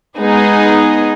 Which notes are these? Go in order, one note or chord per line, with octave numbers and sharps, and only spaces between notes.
G#3 B3 D#4 G#4